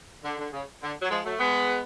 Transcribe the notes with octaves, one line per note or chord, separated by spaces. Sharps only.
D3
D3
C#3
D3
F#3
F3 G#3
F#3 A3
G#3 B3